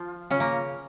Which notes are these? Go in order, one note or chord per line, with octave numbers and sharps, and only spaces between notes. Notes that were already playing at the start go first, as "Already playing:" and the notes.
Already playing: F3 F4
C#3 C#4
A#3